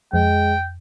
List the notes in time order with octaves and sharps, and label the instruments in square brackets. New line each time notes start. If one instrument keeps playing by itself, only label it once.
[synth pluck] F2 [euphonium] G#3 [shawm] G5